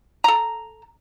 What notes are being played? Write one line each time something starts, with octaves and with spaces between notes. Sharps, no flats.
A4 A#5